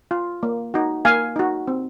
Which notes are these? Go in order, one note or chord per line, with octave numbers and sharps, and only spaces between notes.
F4
A#3
D#4 F#4
A#3 F5 G#5
D#4 F#4
C4